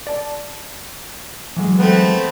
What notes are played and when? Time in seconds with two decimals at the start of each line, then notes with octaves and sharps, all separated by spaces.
0.07 D5 A5
1.56 E3 F#3 G#3
1.78 A3 B3 C4